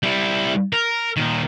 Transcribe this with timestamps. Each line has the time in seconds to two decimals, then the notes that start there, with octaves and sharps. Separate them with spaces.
0.03 G3 E4
0.73 A#4
1.17 A#2 D#3